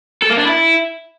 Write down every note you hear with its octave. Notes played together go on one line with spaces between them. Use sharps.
A4
A#3
D4
E4